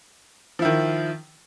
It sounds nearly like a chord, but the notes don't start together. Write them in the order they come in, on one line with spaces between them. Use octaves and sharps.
F3 E4 D#3